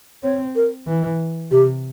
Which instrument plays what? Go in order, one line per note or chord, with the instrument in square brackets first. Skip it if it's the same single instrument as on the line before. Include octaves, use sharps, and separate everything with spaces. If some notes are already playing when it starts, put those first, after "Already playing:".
[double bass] C4 [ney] C#5
[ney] A#4
[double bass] E3
[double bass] C3 [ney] G4